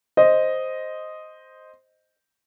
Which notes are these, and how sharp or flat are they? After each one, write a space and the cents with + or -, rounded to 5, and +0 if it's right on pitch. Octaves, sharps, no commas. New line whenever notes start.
C5 +0 D#5 +0